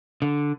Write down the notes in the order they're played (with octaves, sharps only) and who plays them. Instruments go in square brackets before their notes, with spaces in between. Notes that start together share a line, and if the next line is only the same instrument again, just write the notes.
[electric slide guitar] D3